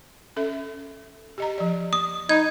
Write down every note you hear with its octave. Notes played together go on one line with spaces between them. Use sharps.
C#4 A4 E5
G4 D#5 A#5
F3 D5
D#6
D#4 B5 G#6